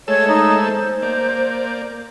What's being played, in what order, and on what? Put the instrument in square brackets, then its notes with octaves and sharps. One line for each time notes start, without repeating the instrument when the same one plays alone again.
[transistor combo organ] G#3 A3 E6 [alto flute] C#5
[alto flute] D#4
C5
[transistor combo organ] A#3 D5